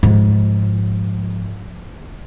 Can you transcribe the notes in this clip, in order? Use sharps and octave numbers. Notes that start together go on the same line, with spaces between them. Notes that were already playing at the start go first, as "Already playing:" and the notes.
G#2 F3